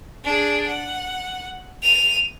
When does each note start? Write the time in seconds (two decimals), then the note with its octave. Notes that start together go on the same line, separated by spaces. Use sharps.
0.24 D4 G#4
0.67 F#5
1.83 D#7 F7